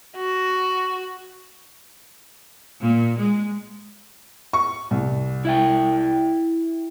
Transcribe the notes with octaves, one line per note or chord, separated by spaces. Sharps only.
F#4
A#2
G#3
C#6
C2
E4 E5 G5